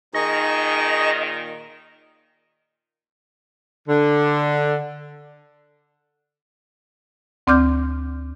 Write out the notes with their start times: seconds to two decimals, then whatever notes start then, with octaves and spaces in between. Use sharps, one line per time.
0.14 A#2 D#3 D#4 G#4 D#5 C#6
3.87 D3
7.47 D2 C4 D5 D6 F6 G6